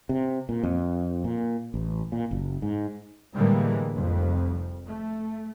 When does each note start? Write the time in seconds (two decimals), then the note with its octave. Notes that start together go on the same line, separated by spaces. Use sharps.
0.09 C3
0.49 A#2
0.63 F2
1.24 A#2
1.74 A1
2.12 A#2
2.31 F#1
2.62 G#2
3.35 A2 D3 E3 G3 G#3 A#3
3.94 F1 C2 F2
4.87 A3